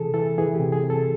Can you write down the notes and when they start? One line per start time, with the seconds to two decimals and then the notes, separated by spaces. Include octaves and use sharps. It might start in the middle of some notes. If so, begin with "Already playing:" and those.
Already playing: C3 E3 G#4 A4
0.14 E3 A4
0.38 E3 G#4
0.55 G4
0.60 C3
0.72 G#4
0.84 C3
0.90 A4